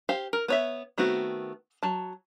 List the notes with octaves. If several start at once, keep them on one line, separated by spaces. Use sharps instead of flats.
G4 C5 F5
A#4
B3 C#5 E5
D#3 A3 B3 C4 F#4
F#3 A5